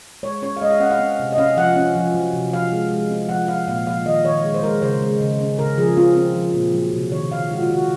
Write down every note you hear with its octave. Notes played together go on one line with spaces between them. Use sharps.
G#3 C#5
C#4 C#5
F5
G#3 D#5
F5
C#4 F#5
F5
C4
C3
D#5
C#4 F5
F3 F#5
C#4
F3
F#3
C3
F3 F5
G#3
G#3
C4
F3 F#5
F3 F5
A#2 F5
F3 F5
D#3 D#5
D#3 C#5
G#3
C5
G#3 A#4
C#3 C5
G#3
C#3
C#4
C#3 A#4
F3 G#4
C4 F4
C4
F3
A#2
F#3
C3
D#3 C#5
D#3 F5
G#3 F#4
F4
D#3 F#4